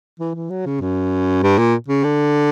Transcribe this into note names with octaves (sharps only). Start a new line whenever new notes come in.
E3
E3
F#3
C#3
F#2
G2
A#2
C#3
D3